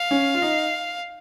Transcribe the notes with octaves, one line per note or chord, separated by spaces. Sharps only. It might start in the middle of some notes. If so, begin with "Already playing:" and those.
Already playing: F5
C#4
F4
D#4